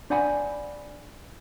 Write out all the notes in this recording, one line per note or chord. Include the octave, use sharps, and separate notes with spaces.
D4 C5 D5 F#5 G#5 B5